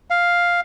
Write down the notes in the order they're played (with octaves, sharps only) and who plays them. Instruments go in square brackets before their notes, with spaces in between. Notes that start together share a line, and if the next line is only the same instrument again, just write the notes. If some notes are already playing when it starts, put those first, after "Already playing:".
[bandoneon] F5